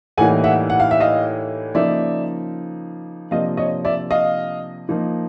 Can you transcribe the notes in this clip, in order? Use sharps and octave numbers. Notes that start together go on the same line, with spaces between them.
A2 E3 G3 A#3 D#4 F#5 G#5
E5 F#5
F#5
F5
E5
D#5 F5
C#3 F3 A#3 D#4 D5 E5
C3 F3 A#3 D4 D#5 F5
C#5 D#5
D5 E5
D#5 F5
F3 A#3 D#4